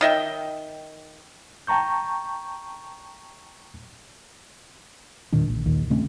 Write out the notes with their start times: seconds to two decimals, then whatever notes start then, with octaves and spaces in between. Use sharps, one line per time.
0.01 D#3 D#5 E5 G5
1.67 G5 A5 A#5 C#6 G6
5.33 E1 A#2 D#3 D4
5.48 A#1
5.66 D#2 A#2 D#3
5.90 C#3 A3 C4 C#4